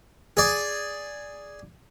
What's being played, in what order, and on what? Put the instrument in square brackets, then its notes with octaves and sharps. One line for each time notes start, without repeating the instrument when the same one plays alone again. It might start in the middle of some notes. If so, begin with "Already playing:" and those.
[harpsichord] G#4 D5